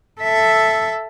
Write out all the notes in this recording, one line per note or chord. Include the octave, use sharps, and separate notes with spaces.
A4 E5